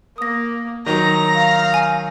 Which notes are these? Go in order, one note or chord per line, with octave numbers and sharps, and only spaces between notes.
A#3 D#6 A#6
D#3 F#3 D#4 A#5
F5
G#5